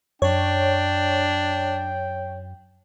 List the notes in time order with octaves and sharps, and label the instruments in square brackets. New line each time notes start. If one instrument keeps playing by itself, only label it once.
[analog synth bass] F#2 [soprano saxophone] D4 [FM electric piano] C#5 [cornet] G5